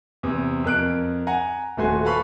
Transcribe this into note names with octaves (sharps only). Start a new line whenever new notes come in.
E2 C3
F2 A#4 F#6 D7
F#5 G#5 A#5
D#1 A3 F#4 C5 G#5
A4 B4 F5 B5 C#6